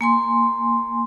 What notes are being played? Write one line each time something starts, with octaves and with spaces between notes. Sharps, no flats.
A#3 G#5 C6